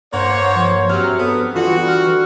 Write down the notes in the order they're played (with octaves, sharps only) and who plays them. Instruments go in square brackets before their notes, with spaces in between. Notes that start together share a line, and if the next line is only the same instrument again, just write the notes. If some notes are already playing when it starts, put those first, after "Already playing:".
[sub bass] G2 [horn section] A#3 C5 C#5 [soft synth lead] F#5
[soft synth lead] F3
[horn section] C3 F#3 [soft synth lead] F6
[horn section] B3 [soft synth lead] A4
[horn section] D3 G3 F#4 [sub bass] E3 [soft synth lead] F4
[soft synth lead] F6